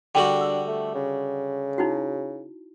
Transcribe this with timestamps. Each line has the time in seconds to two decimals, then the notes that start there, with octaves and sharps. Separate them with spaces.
0.15 D3 G3 D4 F#4 G#4 G5
0.41 E6
0.67 A3
0.94 C#3
1.78 D#4 E4 F#4